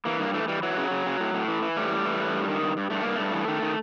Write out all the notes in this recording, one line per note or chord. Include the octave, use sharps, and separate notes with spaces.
E3 A#3
G2 A#3
E3 A3
E3 G3
E3 F#3
C#3
C#3
C#3
A2
A2
E3
E3
A2 G3
A2
E3
A2
G2
D#3
G2
G2
G2 A3
G2 A#3
G2 A3
E3
D#3
D#3